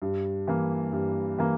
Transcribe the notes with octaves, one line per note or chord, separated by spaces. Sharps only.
G2
E3 A#3
G2
E3 A#3